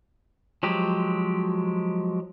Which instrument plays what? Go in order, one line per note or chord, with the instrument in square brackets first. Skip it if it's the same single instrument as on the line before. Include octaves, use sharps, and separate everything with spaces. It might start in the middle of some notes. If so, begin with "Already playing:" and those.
[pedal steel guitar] F3 F#3 G#3 G4